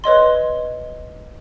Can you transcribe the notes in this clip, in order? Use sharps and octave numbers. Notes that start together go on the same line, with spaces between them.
B4 C#5 D#5 C6